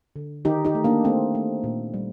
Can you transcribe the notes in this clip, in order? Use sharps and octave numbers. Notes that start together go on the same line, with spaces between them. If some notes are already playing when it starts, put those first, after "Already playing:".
D3
D#3 D#4 G4
D#4 G4
A3
A#3 D4
A3 C4
A3
A#2
G3